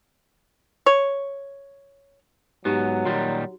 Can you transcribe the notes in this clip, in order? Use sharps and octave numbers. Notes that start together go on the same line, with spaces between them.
C#5
G#2 F#3 B3 D#4 G4 A#5
A#2 D#3 G3 F#4